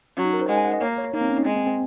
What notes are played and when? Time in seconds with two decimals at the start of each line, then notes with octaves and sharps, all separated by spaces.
0.17 F#3 C#4
0.24 D#4
0.33 A#4
0.41 C5
0.49 G#3 F#5
0.58 G#5
0.65 F#5
0.74 D#5
0.81 A#3 C#5
0.98 C#5
1.14 A#3 D#4
1.21 C4
1.29 C#4
1.38 D#4
1.45 G#3 C4
1.56 C4
1.67 C4